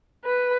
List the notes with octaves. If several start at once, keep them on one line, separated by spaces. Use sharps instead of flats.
B4